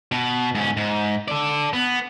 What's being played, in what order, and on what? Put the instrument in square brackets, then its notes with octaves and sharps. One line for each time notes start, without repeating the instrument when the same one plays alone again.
[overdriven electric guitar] B2
G#2 C#4
G#2
A4 D5
B3